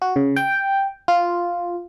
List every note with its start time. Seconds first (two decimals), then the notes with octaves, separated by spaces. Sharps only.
0.02 F#4
0.16 C#3
0.36 G5
1.08 F4